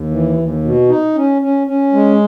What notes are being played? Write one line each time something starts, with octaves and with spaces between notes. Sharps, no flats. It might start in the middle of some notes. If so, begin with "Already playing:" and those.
Already playing: D#2
E3
D#2
B2
D#4
C#4
C#4
C#4
G#3